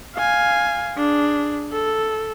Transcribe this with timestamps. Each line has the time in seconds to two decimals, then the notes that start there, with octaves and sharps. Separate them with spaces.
0.15 F5 G#5
0.97 D4 G#4
1.73 A4